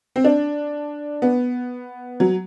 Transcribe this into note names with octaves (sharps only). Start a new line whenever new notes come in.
C4
D4
B3
F#3